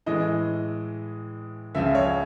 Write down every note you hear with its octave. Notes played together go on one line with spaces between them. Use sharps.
A2 E3 G#3 D#5
C#2 C#3 F3 E5
C#5